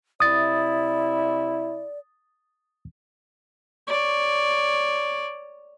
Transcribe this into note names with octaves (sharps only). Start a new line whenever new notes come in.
C3 E4 D5 D#6 A6
C#5 D5